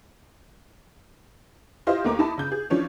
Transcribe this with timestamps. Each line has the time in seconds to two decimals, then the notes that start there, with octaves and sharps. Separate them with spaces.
1.87 E4 F4 G4 C5 D#5 F5
2.04 D#2 A3 A#3 A#5 D6
2.19 D#4 E4 A5 B5
2.38 C#3 G6
2.52 G#4
2.70 E3 F3 C#4 D4